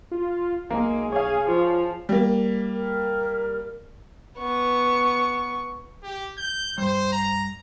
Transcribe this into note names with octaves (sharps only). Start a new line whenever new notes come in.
F4
B1 G#3 A#3
G#4 C#5 F5
F3 F4
G3 A#3
A#4
B3 C#6
G4
G6
G2 G3 C5
A#5